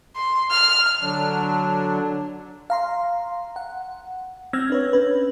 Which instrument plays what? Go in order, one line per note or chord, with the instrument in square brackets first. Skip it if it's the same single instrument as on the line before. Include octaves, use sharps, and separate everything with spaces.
[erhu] C6
F6
[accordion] D3 F#3 D4
[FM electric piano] F5 A#5 C6
F#5
C4 E6 F6 G#6 A#6
D4 B4 C#5
C#4 B4